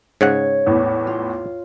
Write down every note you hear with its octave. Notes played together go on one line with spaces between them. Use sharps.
G#2 C#3 C#5 F#5
E2 A2 B3
F4